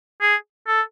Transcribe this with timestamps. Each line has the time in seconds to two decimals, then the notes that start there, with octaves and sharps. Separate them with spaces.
0.21 G#4
0.67 A4